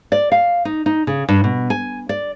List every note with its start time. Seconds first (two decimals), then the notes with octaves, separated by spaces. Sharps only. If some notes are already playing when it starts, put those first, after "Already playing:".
0.12 D5
0.32 F5
0.65 D#4
0.86 D#4
1.07 C#3
1.29 G2
1.44 B2
1.70 G#5
2.09 D5